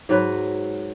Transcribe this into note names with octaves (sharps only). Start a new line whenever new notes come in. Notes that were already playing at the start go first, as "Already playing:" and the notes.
G#2 F#3 B4